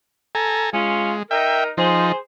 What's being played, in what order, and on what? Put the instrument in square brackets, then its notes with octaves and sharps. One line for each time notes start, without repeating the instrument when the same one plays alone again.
[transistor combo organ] A4 G#5 A#5
[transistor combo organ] G#3 [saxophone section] C#4 F4
[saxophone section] D#4 A#4 [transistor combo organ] E5 G5
[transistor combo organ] F3 D#4 [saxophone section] G#4 C5